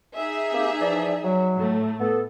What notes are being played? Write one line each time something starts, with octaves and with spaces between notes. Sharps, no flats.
D#4 G#4 E5
A#3 C4 G4
E3 F3 D5
F#3
A2 A3
B3 A4